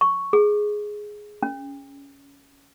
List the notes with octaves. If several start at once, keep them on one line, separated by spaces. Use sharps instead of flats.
C#6
G#4
C#4